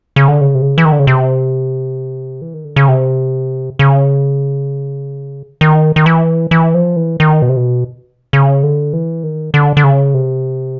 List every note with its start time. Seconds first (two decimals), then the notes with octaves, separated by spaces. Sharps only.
0.16 C#3
0.28 D3
0.41 C#3
0.55 C3
0.62 C#3
0.78 E3
0.85 D#3
0.92 D3
0.99 C#3
1.07 C3
2.42 E3
2.54 D#3
2.65 D3
2.76 C#3
2.88 C3
3.79 C#3
5.61 D#3
5.96 D#3
6.06 E3
6.51 E3
6.74 F3
6.96 E3
7.20 D#3
7.42 B2
7.49 C3
7.57 B2
8.33 C#3
8.63 D3
8.93 E3
9.23 D#3
9.54 D3
9.77 D3
9.84 C#3
10.14 C3